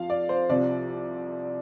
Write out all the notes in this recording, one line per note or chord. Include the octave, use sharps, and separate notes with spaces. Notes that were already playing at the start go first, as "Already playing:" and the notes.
Already playing: F2 F3 F5
D5
C5
C2 C3 F3 D5